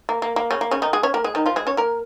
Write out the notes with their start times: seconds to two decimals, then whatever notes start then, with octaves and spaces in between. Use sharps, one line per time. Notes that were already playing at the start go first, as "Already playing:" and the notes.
0.09 A#3
0.22 A#3
0.36 A#3
0.51 C#3 C#4
0.61 A#3
0.71 C#3 C#4
0.82 D#3 D#4
0.93 G#3 G#4
1.03 C#4 C#5
1.14 A#3 A#4
1.24 G#3 G#4
1.35 D#3 D#4
1.46 F3 F4
1.56 G#3 G#4
1.67 C#4 C#5
1.77 A#3 A#4